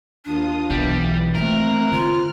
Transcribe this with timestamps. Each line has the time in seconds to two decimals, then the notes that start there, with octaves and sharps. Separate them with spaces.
0.25 D#2 D4 F4 D#6
0.70 B1 E3 G3 B3
1.35 A3 A#3 C4 F4 A#4 F#6
1.92 D3 F4 F6